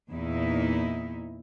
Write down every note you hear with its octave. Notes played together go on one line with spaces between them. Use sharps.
E2 A#2 D#4 E4